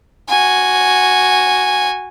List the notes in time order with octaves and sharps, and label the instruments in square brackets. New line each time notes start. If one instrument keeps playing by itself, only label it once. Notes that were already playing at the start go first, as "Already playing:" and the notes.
[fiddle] F#4 G#5